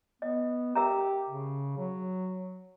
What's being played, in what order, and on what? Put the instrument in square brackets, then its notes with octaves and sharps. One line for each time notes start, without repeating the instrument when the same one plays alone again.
[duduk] B3 [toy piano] D#5
[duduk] G4 [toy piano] A#4 E5 A#5
[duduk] C#3
F#3